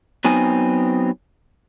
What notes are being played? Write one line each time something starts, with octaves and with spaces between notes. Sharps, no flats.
F#3 B3 C4 D#4 G#5